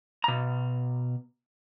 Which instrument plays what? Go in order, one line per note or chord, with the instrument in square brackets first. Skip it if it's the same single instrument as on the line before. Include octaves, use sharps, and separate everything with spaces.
[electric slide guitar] B2 A#5